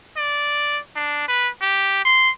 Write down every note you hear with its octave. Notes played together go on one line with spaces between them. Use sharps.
D5
D4
B4
G4
C6